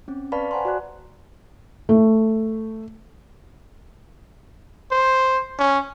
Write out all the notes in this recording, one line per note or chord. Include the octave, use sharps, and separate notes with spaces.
C4 C#4
B4 D5 F5 A5 B5 C#6
C5 F#5 G#5 A#5 C6
F#4 D5 F#6
A3
C5
C#4